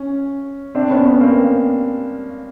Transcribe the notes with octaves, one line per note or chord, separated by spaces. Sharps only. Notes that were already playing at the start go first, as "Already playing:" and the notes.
Already playing: C#4
C4 D4
B3 C#4
B3 C#4
A#3 C4